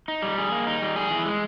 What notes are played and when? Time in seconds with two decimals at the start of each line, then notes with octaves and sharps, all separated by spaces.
0.08 D#4
0.22 G3
0.38 G#4
0.52 A#3
0.67 D#4
0.82 G3
0.96 G#4
1.11 E3
1.26 G#3